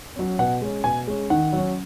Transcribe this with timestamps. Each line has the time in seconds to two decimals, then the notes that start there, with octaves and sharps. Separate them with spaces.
0.16 F#3 C#4
0.39 B2 F#5
0.62 G#3 C#4
0.84 B2 G#5
1.07 G#3 C#4
1.30 D#3 F#5
1.53 F#3 C#4